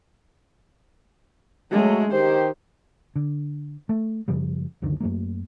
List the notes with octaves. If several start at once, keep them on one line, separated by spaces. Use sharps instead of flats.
F#3 G#3 A3
D#3 G4 C5
D3
A3
F#2 C#3 F3 G3
C#2 F#2 D3 D#3
F#2 F#3 A3 A#3